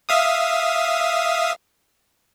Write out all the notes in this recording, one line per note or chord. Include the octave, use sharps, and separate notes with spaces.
E5 F5 D#6